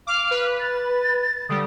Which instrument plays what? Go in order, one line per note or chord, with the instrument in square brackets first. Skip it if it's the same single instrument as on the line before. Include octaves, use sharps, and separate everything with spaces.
[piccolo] F5 [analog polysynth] D6
[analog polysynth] B4
[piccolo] A6
[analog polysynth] D3 G3 [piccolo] D#6